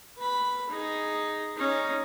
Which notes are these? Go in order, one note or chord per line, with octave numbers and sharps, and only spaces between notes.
B4 B5
D#4 G#4
C#4 D#4